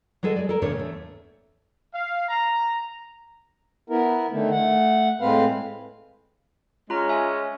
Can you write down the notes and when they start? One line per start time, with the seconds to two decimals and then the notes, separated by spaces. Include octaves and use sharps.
0.23 F#3 G#3 G#4 A4 B4 D#5
0.36 G#4 D5
0.49 A4 A#4
0.62 E2 A2 C#3 A3 D4 C#5
0.75 E2 A3
1.93 F5
2.29 A#5
3.90 B3 E4 A#4
4.31 D3 D#3 A3
4.51 A3 F#5
5.21 A2 G#3 C4 B4 F5
6.90 G#3 C#4 F4 A#5
7.09 E5 G#5